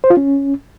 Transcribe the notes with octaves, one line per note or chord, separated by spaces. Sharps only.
C5
F4
C#4